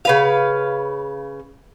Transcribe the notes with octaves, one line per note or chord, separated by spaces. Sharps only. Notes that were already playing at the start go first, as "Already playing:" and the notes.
C#3 B4 F5